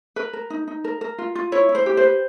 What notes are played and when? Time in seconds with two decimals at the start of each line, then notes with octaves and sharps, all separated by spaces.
0.16 A#4 B4
0.33 A#4
0.50 D#4
0.68 D#4
0.84 A#4
1.01 A#4
1.18 F4
1.35 F4
1.52 E4 C#5
1.69 E4
1.75 C5
1.86 G4
1.97 C5
2.03 B4